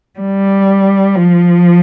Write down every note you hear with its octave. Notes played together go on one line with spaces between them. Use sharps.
G3
F3